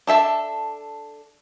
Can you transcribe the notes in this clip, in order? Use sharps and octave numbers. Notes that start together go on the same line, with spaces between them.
D4 A4 E5 A5